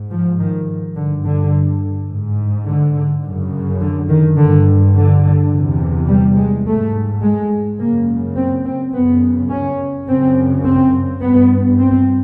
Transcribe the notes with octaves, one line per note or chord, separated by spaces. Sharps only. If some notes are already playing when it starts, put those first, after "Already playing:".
Already playing: G#2
F3
D#3
G2 D3
D3
G#2
D3
F#2 C#3
D3
D#3
G2 D3
D3
E2 C3
G3
G#3
G#2 A3
G#3
F#2 C#3 A#3
C4
C4
F#2 C#3 B3
C#4
F#2 C#3 C4
C4
G2 B3
C4